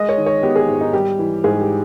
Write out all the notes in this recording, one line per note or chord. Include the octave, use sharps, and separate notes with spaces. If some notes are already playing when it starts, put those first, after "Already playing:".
Already playing: G#3 D#5
C#5
D#3
C#5
B3 G4
G#4
G#2
D#4
G3 G4
E3
G#2 G#4
G4